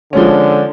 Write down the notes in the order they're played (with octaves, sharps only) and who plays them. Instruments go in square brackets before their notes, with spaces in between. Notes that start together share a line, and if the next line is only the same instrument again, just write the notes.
[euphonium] D3 [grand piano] F3 G#3 C#4